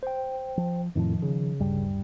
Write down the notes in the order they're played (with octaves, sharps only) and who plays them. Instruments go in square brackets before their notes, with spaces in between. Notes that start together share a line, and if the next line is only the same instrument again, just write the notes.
[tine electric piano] C5 G5
[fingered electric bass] F3
[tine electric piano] F2 A2 [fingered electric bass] D#3 F3
[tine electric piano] C#3
[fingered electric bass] D1 G2 G3